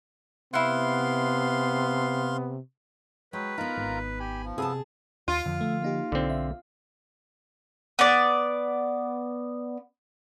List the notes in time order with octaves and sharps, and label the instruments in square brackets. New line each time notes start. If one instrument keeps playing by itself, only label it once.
[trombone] C3 [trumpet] B3 [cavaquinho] E4 F#5 [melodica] F5 C6
[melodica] F#3 C#5 G5 [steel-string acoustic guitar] G#3 [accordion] B4
[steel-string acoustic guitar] B3 D#4 [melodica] F4 A#4 A#5
[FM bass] G#1
[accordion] G4 [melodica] G#5 B5
[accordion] F3
[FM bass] C3 [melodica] B3 A4 [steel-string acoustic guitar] G#4 G#5 A5
[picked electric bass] D#2 [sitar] F4
[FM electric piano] F2 [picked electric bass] D3 F3
[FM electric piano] A3
A#3 D#4 G4
[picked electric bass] B1 [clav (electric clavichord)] D3 C4
[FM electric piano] E5
[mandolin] B3 D5